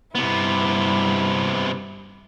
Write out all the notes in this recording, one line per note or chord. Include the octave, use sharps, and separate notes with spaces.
G2 C3 B3 E4